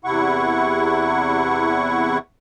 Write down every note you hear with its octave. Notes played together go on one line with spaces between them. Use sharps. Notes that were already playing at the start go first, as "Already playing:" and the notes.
E2 C3 E4 F#5 C#6